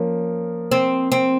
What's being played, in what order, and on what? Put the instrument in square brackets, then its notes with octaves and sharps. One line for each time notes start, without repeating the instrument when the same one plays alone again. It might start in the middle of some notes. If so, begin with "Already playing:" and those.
Already playing: [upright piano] F3 A#3 [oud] C#4
[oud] C4
C4